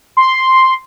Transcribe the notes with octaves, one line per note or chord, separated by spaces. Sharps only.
C6